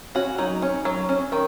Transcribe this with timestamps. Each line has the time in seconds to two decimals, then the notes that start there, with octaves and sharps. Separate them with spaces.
0.15 C#4 F#4
0.38 F#3 D#4
0.62 C#4
0.85 F#3
1.09 C#4
1.32 D#3